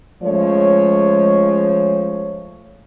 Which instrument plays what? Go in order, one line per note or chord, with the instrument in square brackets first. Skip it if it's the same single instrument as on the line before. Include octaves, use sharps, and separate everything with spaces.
[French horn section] F3 G#3 A3 C#4 C#5